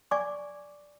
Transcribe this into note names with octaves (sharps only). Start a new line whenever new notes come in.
D5 G#5 C#6 D6